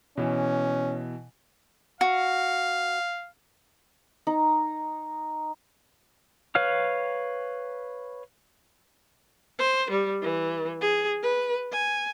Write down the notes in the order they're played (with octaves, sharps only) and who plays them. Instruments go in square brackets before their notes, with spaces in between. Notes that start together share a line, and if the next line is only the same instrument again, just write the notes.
[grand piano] B2 E3 [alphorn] C#4
[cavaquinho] F#4 [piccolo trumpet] F5
[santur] D#4
[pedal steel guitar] B4 C#5 F5 F6
[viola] C5
G3
E3
G#4
B4
G#5